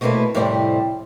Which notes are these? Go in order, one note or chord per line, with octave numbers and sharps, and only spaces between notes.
B2 A3 A#3 C4 E4 B4
F2 A2 C3 G3 C4